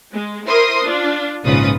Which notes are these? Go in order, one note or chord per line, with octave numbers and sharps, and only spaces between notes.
G#3
E4 A#4 C5 C6 D#6
D4 F4
A#1 G#2 C#3 F4 B4 D#6